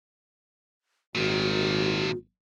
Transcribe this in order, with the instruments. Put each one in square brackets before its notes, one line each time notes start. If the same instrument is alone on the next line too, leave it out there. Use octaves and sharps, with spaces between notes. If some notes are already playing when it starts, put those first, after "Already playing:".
[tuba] G#1 [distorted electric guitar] A#2 D#3 [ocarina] F#4